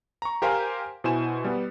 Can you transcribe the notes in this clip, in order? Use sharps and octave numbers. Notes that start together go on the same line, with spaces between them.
A#5 C#6
G4 A#4 C5 F5 G#5
B2 E4 C5 G#5 E7
G3 B3